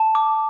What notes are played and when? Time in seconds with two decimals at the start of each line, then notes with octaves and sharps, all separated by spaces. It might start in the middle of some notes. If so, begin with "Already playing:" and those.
Already playing: A5
0.15 D6